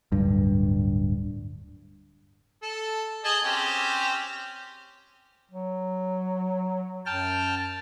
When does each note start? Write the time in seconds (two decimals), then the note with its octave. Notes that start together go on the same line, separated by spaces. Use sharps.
0.12 D1 G2
2.62 A4
3.24 G#4 D#5 A5
3.44 C4 C#4 G4
5.51 F#3
7.06 F#2 G5 A5 F6